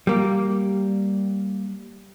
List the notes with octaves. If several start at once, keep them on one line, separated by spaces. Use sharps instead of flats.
G3 A#3